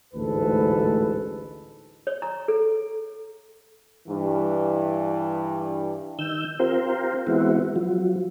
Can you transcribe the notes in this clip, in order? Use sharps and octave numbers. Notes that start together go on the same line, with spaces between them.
A1 D2 G#2 A4 B4
C#5
A#5
A4
G2 E3
D#3 E6 G6
C4 F4 G4 A#4 C5
E3 G#3 B3 C4 E4 F#4
F3 F#3